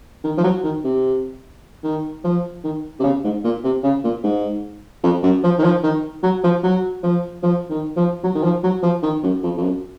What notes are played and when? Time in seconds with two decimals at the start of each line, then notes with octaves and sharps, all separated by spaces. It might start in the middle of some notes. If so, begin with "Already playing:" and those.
0.24 D#3
0.38 F3
0.44 F#3
0.64 D#3
0.84 C3
1.84 D#3
2.24 F3
2.64 D#3
3.00 C3
3.03 C#3
3.24 G#2
3.44 A#2
3.64 C3
3.83 C#3
4.04 A#2
4.24 G#2
5.04 F2
5.23 F#2
5.43 F3
5.59 D#3
5.64 F3
5.83 D#3
6.23 F#3
6.44 F3
6.63 F#3
7.03 F3
7.43 F3
7.70 D#3
7.96 F3
8.23 F#3
8.35 D#3
8.44 F3
8.63 F#3
8.83 F3
9.03 D#3
9.23 F#2
9.43 F2
9.57 F2
9.62 F#2